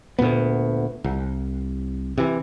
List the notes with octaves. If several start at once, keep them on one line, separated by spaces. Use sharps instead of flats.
D2 A#2 A#3 B3
C2
C3 E3